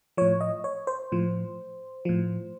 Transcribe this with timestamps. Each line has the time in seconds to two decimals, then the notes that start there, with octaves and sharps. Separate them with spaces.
0.17 A2 F3 C#5
0.41 D#5
0.64 C#5
0.87 C5
1.12 A2 F3
2.05 A2 F3